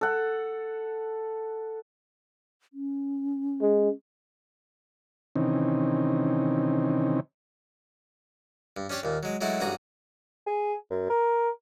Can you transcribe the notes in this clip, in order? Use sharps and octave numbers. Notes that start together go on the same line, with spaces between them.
A4 F#5
C#4
G#3
C3 D#3 E3 C4 C#4 D#4
G2
C#4 D4 G4 C#5 G5
D#2 A#2
F#3 G#3
F#3 G#3 A3 E4 F#4
A1 G2 F#4 G#4 A#5
G#4
F#2
A#4